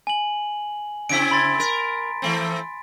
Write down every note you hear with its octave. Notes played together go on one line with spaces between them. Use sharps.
G#5 F#7
C#3 C4 E4 B6 D7
B5 C6 A6
A#4
E3 A3 C4